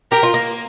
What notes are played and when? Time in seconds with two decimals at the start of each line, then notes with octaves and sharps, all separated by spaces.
0.11 G4 A#4
0.23 F4
0.34 A#3